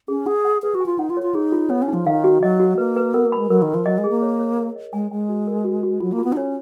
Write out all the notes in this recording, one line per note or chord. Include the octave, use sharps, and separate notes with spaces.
C#4 G#4
G#4 F#5
F#5
G#4 B4
F#4
G#5
F4
D#4 F#5
F4
C#5
F4
D#4 G#4
F4
B3 C#5
C#4
D#4
F3
D#3 F5
F#4
F#3 D#5
F#4
A#3 B4
B4
B3 A#4
A#3
B5
G#3
F#3 A#4
D#3
A#4
F3
F#3 D#5
G#3
G#4
A#3
C#5
C#5
A#4
D#5
G#3 G#5
G#3 G#5
F#4
A#4
F#4
F#4
F#3 F4
A#3
F4
B3
D#4
C#4 C#5